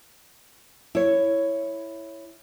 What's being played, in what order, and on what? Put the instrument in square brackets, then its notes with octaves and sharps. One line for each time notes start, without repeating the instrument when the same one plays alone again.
[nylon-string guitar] E4 C#5